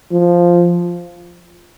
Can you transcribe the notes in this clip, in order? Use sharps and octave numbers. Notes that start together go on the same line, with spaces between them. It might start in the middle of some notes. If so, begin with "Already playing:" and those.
F3